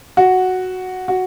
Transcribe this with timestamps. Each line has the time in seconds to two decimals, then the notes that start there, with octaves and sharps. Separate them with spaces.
0.17 F#4
1.08 F#4